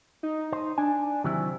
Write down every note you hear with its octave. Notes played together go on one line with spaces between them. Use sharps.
D#4
C5
D4 G#5
C3 D#3 F#3 E4